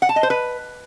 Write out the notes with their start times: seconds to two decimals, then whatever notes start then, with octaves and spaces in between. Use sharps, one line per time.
0.02 F#5
0.09 A5
0.16 D#5
0.23 C5
0.30 B4